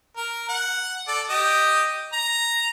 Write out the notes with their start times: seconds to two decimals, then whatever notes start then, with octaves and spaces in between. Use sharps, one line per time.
0.17 A#4
0.49 F#5
1.08 A4 D5
1.29 G4 D#5
2.13 A#5